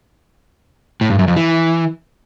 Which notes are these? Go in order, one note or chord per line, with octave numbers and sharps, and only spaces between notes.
A2
G2
F#2
F2
E3